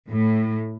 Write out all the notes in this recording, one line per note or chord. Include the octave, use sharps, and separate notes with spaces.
A2